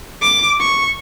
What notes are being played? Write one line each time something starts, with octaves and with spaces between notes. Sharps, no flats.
D6
C#6